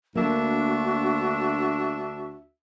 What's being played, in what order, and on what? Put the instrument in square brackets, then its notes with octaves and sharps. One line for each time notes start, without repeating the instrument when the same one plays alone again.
[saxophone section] D2 D4 E5 [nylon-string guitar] A#3 A5 [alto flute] F#4